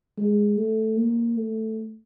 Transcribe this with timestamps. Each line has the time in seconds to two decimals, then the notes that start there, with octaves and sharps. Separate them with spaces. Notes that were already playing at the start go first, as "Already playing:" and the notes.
0.18 G#3
0.57 A3
0.98 A#3
1.38 A3